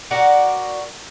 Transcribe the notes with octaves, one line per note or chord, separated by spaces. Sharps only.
F#4 A#4 D5 F#5